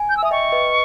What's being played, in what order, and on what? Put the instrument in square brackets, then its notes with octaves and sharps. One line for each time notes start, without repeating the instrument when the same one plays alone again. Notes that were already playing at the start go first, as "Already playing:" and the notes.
Already playing: [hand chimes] G#5
[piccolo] G6
E6
[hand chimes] E5 [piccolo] D#6
[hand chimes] D#5 G5 [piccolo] C#6
[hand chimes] B4 D#5